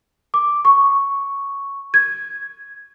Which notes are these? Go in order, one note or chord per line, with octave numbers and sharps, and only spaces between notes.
D6
C#6
G#6